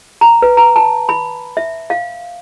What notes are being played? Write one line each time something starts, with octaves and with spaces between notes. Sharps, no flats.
A#5
B4
A#5
A5
B5
E5
F5